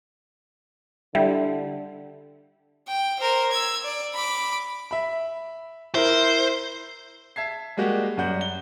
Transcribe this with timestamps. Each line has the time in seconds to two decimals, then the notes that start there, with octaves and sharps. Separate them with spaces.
1.15 D3 G3 E4
2.87 G5
3.20 A#4 C5
3.52 E6 G#6
3.84 D5
4.14 B5 D6
4.91 E5 B5
5.95 E4 A#4 C5
7.36 E5 A5 G#6 C7
7.77 G3 G#3 A#3 F#4 G4
8.17 F#2 G3 F#5 G6
8.41 G7